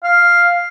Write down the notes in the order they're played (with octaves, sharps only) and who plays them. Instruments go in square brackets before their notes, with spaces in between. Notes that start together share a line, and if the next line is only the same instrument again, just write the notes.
[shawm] F5